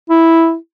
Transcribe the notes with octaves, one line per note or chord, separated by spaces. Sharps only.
E4